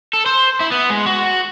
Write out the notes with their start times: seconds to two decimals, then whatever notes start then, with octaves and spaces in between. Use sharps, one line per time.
0.13 A4
0.26 C5
0.60 E4
0.72 B3
0.90 G#3
1.06 F#4